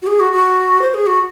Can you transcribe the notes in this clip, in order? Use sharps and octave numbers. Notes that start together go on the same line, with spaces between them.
F#4
G#4
F#4
F#4
C5
G#4
F#4